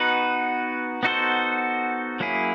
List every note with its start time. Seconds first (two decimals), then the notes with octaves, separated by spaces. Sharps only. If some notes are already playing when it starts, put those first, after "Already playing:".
Already playing: B3 D#4 F#4 B4
1.03 B3 D#4 F#4 A4 C5
2.20 F#3 A#3 C#4 E4 G#4